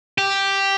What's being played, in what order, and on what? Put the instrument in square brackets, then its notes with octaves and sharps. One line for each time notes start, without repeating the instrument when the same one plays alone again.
[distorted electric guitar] G4